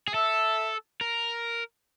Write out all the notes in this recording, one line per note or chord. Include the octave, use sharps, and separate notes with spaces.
G#4
A4 E5
A#4